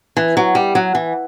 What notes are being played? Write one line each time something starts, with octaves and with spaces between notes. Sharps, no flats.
E3
F#3
G3
F#3
E3